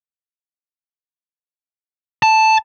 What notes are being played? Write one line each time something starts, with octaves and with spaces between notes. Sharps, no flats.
A5